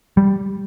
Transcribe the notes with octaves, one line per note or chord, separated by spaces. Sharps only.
G3